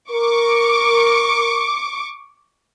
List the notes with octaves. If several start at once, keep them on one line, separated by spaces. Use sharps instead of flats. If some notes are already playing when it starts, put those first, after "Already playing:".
A#4 C#6 D6